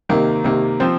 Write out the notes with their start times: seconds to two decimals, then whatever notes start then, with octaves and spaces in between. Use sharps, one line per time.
0.09 C3 D#3 A#3
0.44 C3 D#3 A#3
0.80 F3 C4